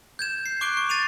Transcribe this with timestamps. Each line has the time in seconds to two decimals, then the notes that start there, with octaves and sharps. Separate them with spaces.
0.19 G6 G#6 E7
0.46 C7
0.61 C#6 D6 F#6 C7 D7 G7
0.77 C#6
0.89 A6 C7 D#7 F7